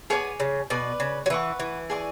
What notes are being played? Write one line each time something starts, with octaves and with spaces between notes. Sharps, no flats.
B3 G#4 C#5 G#5 D6
C#3
B2 B4 D5 G#5
C#3
F#3
E3 B4 F#5 C#6
E3
G#4 D5 G#5 C#6